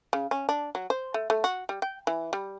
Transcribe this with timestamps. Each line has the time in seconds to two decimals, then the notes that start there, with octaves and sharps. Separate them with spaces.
0.13 C#3
0.31 C#4
0.49 D4
0.75 F#3
0.90 C5
1.14 A3
1.30 A3
1.44 F#4
1.69 G3
1.82 G5
2.07 E3
2.33 G3